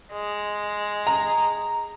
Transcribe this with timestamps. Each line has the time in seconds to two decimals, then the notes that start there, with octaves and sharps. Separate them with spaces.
0.13 G#3
1.07 A#5